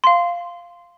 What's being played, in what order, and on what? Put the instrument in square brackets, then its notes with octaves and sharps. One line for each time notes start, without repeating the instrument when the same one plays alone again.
[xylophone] F5 C6